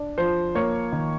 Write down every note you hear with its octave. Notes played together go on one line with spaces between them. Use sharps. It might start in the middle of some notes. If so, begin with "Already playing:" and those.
Already playing: D4
F3 C5
A#3 C#5
D#3